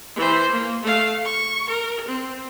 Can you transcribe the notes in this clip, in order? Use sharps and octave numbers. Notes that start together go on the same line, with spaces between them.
E3 C5
A#3
A3 F5
C#6
A#4
C4